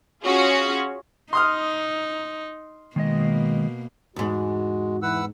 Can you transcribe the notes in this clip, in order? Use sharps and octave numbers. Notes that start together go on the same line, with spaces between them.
C#4 F4 F#4 G#4
D#4 C6 D#6 F6
B2 D#3 G#3 A#3 D#5
E2 G#2 G#3 F#4
E3 B4 F#5 E6